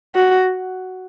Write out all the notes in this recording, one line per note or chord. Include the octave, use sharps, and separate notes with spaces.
F#4